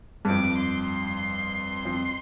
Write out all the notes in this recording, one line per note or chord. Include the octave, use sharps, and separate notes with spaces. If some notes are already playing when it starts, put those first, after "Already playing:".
G2
F2 D6
C6
C6
F2